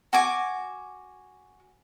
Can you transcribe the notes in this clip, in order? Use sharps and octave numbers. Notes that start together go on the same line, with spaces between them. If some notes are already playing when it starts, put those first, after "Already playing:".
F#4 G#5 D6